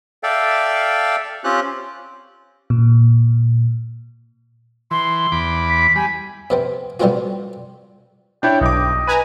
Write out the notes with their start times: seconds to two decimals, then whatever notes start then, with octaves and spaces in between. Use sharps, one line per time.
0.23 A4 D5 E5 F5 G5
1.44 C4 C#4 F4 G4 F#6
2.70 A#2
4.91 E3 C6
5.32 E2 B5 D6
5.70 B6
5.96 G3 G#5 B5
6.50 C3 B3 C4
7.00 D3 G3 B3 C4 F4 F#4
8.43 D4 E4 C#5 G5
8.61 B1 G2 D#5 D6
9.07 B4 G#5 A#5 D#7